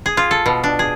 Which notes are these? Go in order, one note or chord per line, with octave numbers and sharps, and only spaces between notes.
G#4
F4
A4
B2
D4
G#4